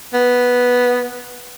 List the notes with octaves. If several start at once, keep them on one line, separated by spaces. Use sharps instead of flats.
B3